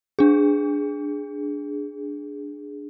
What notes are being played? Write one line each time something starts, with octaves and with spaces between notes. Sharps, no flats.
D4 G#4